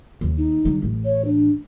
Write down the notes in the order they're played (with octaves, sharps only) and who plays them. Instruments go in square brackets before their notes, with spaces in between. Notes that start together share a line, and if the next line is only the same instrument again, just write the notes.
[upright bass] D#2
[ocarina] D#4
[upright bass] D3 G3
A1
[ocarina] C#5
D4